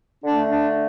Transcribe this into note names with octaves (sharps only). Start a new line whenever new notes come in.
D3 A3 D4
D4